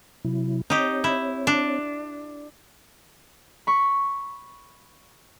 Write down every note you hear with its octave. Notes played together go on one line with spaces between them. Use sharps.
C3 F#3 E4
C4 D#4 G4 C#5
E4
D4
B5 C#6